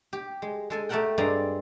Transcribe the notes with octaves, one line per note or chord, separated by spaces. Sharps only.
G4
G#3
G#3 A4 G#5
A3 G4 A4 A#4 F#5 G5
G2 G#3 C4 D5 D#5 A#5